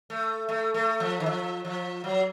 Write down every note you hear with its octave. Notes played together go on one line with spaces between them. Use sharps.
A3
A3
A3
F3
D#3
F3
F3
F#3